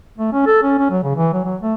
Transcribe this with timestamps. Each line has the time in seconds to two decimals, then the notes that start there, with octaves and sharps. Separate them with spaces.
0.18 A3
0.32 C#4
0.46 A4
0.63 C#4
0.79 C#4
0.90 F#3
1.03 C#3
1.16 E3
1.33 F#3
1.44 F#3
1.62 A3